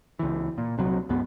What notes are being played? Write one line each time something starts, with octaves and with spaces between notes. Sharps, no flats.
C#2 E3
A#2
C2 C3 F#3
C#2 G2 B3